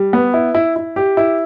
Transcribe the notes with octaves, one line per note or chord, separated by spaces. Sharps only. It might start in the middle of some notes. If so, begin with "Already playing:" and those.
Already playing: G3
B3
E4
E4
E4
G4
E4